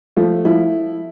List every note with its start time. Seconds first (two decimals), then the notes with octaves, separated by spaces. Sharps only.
0.16 F3 A3
0.45 F3 E4